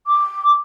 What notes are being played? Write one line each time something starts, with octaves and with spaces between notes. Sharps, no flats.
D6